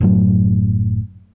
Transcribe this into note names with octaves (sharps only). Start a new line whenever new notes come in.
F#1 A2 F#3